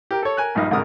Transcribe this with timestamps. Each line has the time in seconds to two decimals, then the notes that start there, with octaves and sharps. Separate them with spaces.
0.11 G4 A#4
0.22 A4 C#5
0.37 A#4 G#5 F#6
0.55 A#1 G2 D#4 F5
0.70 C2 G#2 D3 A#4 D#6 F6